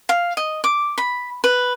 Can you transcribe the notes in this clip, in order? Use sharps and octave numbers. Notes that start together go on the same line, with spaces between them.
F5
D#5
D6
B5
B4